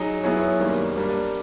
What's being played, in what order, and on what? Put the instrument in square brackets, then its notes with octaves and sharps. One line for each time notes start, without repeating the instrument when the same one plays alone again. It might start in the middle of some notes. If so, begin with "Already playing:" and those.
Already playing: [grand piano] F#3 D#4 G#4
F#3 B3 E4 G#4 C#5
F#2 D#3 G3 A#3
G3 A#3 D4